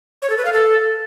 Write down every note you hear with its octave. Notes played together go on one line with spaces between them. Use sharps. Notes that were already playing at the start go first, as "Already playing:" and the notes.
C#5
A4
B4
F5
A4